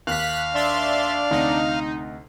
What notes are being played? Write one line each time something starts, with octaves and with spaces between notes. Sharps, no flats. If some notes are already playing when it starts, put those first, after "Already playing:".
D#2 F5 F#6 B6
D4 D5 E5 C6 A6
D2 C3 D#4 D#5